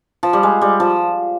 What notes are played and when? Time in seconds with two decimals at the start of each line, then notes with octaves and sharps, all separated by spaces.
0.23 F3
0.33 G3
0.43 G#3
0.61 G3
0.80 F3